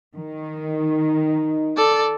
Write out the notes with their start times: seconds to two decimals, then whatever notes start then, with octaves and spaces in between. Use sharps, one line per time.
0.15 D#3
0.71 D#4
1.77 A4 D5